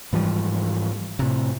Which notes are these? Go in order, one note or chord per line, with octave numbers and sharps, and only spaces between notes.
G#2 E3 F3 G3
A2 C3